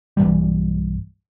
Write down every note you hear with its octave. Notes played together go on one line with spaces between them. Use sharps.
B1 G2 E3 G3